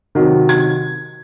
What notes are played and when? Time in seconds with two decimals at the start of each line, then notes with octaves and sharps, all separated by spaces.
0.15 C3 D#3 F#3
0.49 G#6